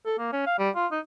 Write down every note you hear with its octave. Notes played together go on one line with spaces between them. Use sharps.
A4
A#3
C#4
F5
G3
F4
D#4